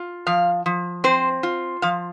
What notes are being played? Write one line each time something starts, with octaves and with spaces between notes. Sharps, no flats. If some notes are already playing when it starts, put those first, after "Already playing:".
Already playing: F4
F3 F5
F3
C4 C5
F4
F3 F5